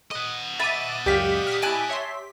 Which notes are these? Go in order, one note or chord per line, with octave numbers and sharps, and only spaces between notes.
D#5 F#5 D#6
E5 B5 D6 A6 D#7
C#2 F#2 G4 D5 F5 B6
D#6 F6
E4 G#5 A5 F#6 D7
C#5 E5 C6